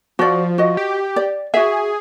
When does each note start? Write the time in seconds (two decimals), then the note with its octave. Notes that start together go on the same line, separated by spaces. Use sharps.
0.19 F3 F#4 D5
0.58 F#4 D#5
0.77 G4
1.16 D5
1.54 F#4 G#4 E5